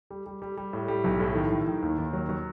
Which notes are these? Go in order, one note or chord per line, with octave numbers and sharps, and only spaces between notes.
G3
G3
G3
G3
A2
G3
B1
A2
D#3
D#3
D#3
D#2
D#2
F#3
F#3